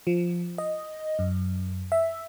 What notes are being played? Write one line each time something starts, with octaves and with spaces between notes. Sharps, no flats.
F3
D#5
F#2
E5